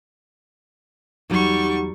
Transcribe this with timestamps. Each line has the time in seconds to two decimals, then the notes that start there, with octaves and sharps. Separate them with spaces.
1.30 E2 F#3 G3 D#4 G4 F#5 C#6